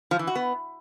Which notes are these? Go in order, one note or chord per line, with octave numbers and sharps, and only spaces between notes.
F3
E3
F#4
B3